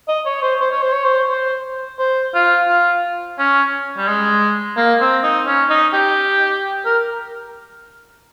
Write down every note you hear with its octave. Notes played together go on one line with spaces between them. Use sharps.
D#5
C#5
C5
C5
C#5
C5
C#5
C5
C5
C5
F4
F4
C#4
G3
G#3
A#3
C4
D#4
C#4
D#4
G4
A#4